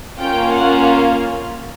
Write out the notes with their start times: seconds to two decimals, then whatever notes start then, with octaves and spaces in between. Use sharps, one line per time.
0.18 A#3 C#4 F4 G5
0.52 F#5